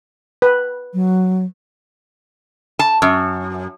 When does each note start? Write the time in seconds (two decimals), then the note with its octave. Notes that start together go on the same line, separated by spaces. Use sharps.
0.42 B4
0.94 F#3
2.79 A5
3.02 F#2